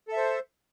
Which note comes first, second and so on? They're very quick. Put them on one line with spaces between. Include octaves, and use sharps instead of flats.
A4 E5 C5